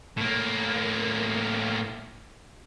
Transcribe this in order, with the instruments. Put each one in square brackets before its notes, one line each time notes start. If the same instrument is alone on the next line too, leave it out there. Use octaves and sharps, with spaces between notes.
[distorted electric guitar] A2 A#3